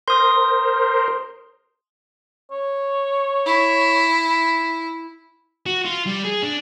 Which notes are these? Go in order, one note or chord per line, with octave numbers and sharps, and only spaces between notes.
A#4 C5 C6 D#6
C#5
E4
F#4
F4
G3
G#4
D4